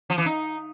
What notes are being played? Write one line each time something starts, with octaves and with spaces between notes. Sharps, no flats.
F3
E3
D#4